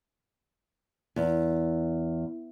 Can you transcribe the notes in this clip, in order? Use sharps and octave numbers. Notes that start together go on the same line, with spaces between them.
E2